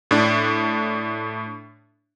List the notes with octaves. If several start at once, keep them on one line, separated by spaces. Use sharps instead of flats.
A2 D4